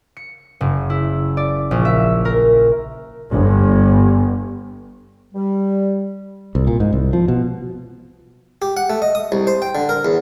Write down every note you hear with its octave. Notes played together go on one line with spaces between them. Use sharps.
C#7
F#1
E4
D5
A#1
E5
A#4
G1
G3
C2
A#2
G#2
C2
F3
B2
G4
F#5
A3
D#5
D#6
C2
C5
G5
D3
A#4
E2